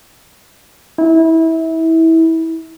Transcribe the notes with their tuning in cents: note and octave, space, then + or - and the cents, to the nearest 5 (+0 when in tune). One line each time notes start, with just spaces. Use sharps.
E4 -25